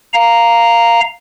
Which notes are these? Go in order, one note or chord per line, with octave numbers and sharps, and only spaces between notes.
F5 A#5